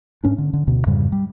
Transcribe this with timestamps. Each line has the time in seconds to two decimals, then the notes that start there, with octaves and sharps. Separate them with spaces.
0.24 G#2 C#4 D4
0.38 D3
0.53 D3
0.67 D2 B2
0.87 F2 G#2 C#3 G3
1.12 G3